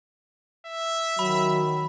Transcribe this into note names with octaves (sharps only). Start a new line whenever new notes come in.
E5
D#3 F#3 B5